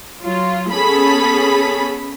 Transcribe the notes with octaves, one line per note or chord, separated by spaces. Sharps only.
F#3 F4
B3 C#4 G#4 A4 B5